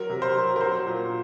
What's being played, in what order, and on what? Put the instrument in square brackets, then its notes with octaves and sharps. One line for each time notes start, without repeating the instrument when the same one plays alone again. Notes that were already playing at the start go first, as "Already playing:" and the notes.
Already playing: [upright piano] F#3 A#4
C3
C5
F#3
A#4
F#3 C5
A#2